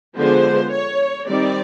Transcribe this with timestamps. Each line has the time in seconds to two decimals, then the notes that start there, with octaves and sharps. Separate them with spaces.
0.18 D3 F3 G#3 B3 C5
0.73 C#5
1.28 D#3 G3 C4 D5